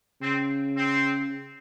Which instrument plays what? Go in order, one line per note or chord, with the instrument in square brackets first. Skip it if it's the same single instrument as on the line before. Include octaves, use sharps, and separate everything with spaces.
[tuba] C#3 [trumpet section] C4
[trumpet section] C4